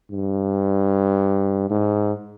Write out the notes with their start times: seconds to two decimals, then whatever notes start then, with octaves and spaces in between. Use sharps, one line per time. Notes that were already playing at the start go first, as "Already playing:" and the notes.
0.11 G2
1.70 G#2